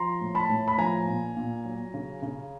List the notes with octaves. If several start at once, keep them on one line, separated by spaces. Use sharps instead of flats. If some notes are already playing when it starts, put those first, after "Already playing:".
Already playing: F3 A#5 C6
A2
A5 B5
A2
B5
F3 G#5 A#5
A#2
A#2
F#3
C#3
C#3